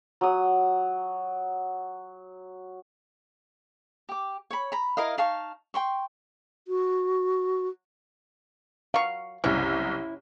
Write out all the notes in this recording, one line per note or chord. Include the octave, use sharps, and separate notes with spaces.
F#3 D#6
G4 D6
C#5 B5
A#5 B5
E4 A#4 D#5 F5
D#4 F5 A5 C#6
G5 C6 C#6
F#4
F#3 F5 C#6
F#1 C2 C#4 E4